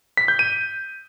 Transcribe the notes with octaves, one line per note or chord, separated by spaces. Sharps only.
B6
G6
D#7